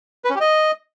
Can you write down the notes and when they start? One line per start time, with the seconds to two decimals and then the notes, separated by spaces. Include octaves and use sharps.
0.25 B4
0.30 C#4
0.35 G4
0.40 D#5